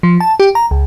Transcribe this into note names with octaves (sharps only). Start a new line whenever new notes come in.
F3
A5
G4
A#5
C#2